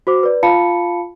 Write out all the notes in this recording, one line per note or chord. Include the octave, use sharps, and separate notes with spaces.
F#4 C5 D6
B4 D5
F4 F5 A5 B5 C#7